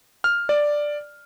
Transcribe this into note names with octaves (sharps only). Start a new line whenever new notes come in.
F6
D5